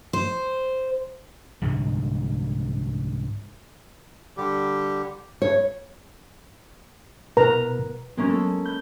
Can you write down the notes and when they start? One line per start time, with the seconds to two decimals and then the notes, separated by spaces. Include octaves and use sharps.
0.13 C5
1.62 C2 G#2 D3 G#3
4.37 D3 G3 G4
5.42 C#3 A3 C#5
7.37 B2 A#4 B4 A#5
8.17 F#3 G#3 A#3 B3 C#4
8.29 A4
8.65 B5 G6